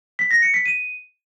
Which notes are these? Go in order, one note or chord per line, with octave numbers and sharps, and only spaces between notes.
B6
A#6
C#7
B6
D#7